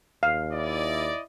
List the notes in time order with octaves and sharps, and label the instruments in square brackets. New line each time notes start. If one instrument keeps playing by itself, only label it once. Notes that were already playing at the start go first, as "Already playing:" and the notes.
[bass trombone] D#2 [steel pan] F5
[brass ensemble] E4 D5 D#5